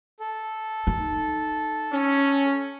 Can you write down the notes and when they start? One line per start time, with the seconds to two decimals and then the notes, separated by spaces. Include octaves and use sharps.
0.20 A4
0.87 D#4
1.93 C#4